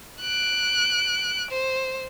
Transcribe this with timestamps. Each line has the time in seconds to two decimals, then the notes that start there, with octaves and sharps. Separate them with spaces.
0.21 F#6 D7
1.51 C5